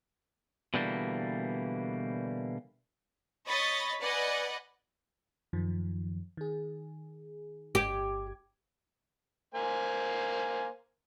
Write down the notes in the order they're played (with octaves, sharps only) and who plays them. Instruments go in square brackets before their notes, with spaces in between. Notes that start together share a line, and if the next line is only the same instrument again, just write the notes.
[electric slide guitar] B2 D3 E3 G3 A#3
[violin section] C#5 D#5 B5 C#6 D#6 A6
B4 D5 D#5 F#5 G#5
[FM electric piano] F#2 D#3 F3
D#3 G#4
[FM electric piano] G1 G#6 [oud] G4
[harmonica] A#3 C5 G#5